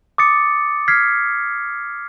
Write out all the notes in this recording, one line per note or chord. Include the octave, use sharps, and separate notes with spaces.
D6 D#6 A6 C#7
F6 G#6 B6 C7